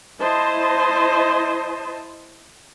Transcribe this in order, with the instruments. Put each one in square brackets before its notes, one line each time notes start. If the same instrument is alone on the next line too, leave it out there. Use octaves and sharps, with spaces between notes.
[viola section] E4 C5 D#5 A5 C6